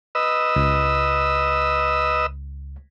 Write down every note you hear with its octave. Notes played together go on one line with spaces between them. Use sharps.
B4 D#5 E6
C#2